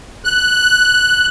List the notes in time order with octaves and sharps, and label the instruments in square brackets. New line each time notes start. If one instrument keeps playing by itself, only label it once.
[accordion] F#6